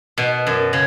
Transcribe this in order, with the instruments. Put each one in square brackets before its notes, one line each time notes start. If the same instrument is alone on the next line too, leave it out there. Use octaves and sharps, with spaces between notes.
[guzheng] B2
F#2
C#3